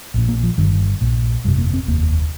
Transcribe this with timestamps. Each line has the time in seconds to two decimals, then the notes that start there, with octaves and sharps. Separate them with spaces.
0.14 A#1 A#2
0.29 A#3
0.43 F3
0.58 G1 G2 D#3
1.01 A#1 A#2
1.44 G1 F2 C3 G3
1.58 A#3
1.74 C4
1.87 F1 D#2 A#3